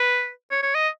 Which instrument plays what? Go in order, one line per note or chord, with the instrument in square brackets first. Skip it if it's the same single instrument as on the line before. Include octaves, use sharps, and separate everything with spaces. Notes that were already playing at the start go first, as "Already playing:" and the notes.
Already playing: [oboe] B4
C#5
C#5
D#5